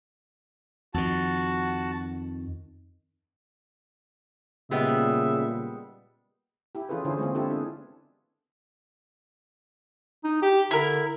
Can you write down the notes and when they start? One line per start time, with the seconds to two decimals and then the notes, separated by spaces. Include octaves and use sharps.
0.94 F2 D#3 F#4 A5
4.71 A#2 C#3 G3 G#3 B3 E5
6.75 E4 G4
6.89 E3 C#4 F4 G#4 A4 B4
7.05 D3 C#4 E4 G#4 C5
7.19 G#3 A#3 C4 F4
7.35 C4 D4 E4 F4 G4 A4
7.50 B3 D4 G#4
10.24 D#4
10.42 G4
10.71 D3 E4 A#4